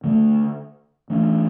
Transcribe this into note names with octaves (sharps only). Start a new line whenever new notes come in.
D3 A3 D4
E3 A3 D4